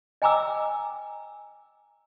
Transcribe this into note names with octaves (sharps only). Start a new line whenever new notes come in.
D#5 G5 G#5 A#5 D6 E6